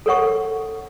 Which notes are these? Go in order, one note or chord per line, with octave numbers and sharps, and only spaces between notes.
A4 A#4 C#5 F#5 C#6